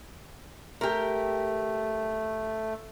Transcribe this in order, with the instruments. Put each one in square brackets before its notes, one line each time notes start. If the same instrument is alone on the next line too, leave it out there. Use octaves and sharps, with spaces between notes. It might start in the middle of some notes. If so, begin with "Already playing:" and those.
[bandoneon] A3 [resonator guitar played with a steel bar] G4 A#4